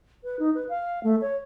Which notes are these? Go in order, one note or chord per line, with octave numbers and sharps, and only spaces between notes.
B4
D#4
B4
F5
A3
C#5